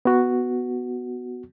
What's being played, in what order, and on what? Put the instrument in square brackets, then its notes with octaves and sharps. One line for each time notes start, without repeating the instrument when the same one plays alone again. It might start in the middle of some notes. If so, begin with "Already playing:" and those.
[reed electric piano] B3 F#4